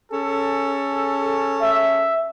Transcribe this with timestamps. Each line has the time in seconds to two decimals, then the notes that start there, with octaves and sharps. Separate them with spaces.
0.11 C#4 G#4 A4
1.61 E5